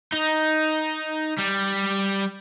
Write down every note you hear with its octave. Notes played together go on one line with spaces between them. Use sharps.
D#4
G3